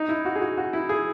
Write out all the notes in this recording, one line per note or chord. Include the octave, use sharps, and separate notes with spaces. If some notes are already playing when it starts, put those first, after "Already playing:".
Already playing: D#4
E4
F#4
G#4
F#4
F#4
E4
G#4